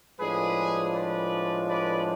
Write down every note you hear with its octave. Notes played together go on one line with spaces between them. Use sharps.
A2 F3 G#3 D4 G#4 B4
B4 D5
B4 D5